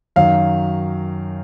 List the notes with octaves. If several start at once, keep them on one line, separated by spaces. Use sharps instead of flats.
F#2 D#3 F#3 F5